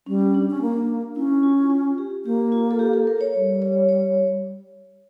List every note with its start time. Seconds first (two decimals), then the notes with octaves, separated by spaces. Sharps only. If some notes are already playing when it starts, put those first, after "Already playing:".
0.06 G3 C#4
0.34 D4
0.50 C#4
0.62 A#3
1.16 C#4 E4
1.43 F4
1.70 F4
1.98 G4
2.25 A#3 G4
2.52 F4
2.71 A4
2.79 G4
2.93 A4
3.07 A#4
3.21 C#5
3.34 G3
3.62 C#5
3.89 C#5